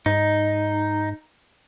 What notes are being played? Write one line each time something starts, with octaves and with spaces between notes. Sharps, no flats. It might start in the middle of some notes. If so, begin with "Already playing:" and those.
G#2 D#4